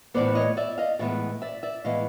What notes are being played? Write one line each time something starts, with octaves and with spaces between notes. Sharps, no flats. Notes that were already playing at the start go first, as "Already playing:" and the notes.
A2 E3 G#3 B3 C5 D5
C#5 D#5
D5 E5
D#5 F5
A2 E3 G#3 B3 D5 E5
D5 E5
D5 E5
A2 E3 G#3 B3 D#5 F5